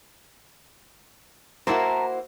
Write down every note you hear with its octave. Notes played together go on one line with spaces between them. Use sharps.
A#3 E4 F#4 A#4 C5 A5 A#5